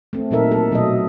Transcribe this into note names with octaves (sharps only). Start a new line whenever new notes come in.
A3 C4
A#2 F#3 D#4 A4 A#4 E5
A4
B2 F#3 A3 B3 A4 D#5